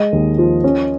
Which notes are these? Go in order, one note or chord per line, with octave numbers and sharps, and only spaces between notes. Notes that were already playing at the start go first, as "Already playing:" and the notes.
Already playing: G#3 D#5
D#2
F3
C#4